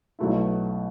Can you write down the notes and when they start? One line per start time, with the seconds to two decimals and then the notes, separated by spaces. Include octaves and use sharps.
0.19 B1 B2 A3 E4